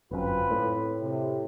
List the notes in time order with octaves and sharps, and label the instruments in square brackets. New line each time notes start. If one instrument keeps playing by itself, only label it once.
[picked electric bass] G1 F#2 [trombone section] C4 F4 B4
[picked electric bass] A2
[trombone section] C3